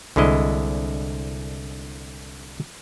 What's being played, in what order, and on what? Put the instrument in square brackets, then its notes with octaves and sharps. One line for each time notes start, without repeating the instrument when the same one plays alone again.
[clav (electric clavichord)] C2 D3 G#3 E4 D#5